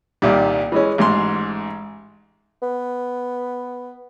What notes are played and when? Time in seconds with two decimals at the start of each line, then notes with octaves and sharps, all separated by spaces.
0.22 C2 A#2 D#3 G3
0.72 E3 G#3 C#4
0.98 A1 G#2 C6
2.62 B3